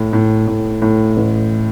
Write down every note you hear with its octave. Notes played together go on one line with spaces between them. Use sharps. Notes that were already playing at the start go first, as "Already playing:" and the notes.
Already playing: A2
A2
A2
A2
A1